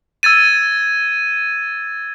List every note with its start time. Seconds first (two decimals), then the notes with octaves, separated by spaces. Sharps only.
0.23 E6 G#6 A6 D#7